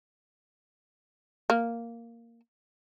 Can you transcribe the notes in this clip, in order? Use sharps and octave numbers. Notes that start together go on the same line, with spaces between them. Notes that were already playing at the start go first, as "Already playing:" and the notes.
A#3